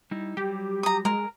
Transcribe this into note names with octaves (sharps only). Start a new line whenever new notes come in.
G3 D#4 E4
F#3 G3 G4
A#5 D#6
G#3 A#4